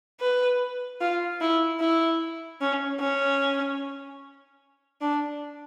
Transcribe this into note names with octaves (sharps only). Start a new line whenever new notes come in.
B4
F4
E4
E4
C#4
C#4
D4